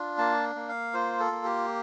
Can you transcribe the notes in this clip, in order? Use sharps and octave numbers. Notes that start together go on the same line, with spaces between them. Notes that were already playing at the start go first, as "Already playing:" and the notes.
Already playing: D4 F4
A#3 A5
A#3
F5
F4 C5
A4
A#3
G4